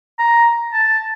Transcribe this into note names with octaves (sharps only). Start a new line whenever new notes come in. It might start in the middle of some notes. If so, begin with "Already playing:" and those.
A#5
A5